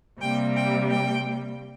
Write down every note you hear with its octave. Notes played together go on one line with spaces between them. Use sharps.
C3 G3 A#3 G5
G5
G5